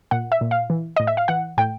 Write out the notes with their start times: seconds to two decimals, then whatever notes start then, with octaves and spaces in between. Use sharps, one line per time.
0.11 A#2 F#5
0.32 E5
0.41 A#2
0.51 F5
0.70 E3
0.96 A2 D#5
1.07 E5
1.17 F5
1.28 E3 F#5
1.58 A2 G5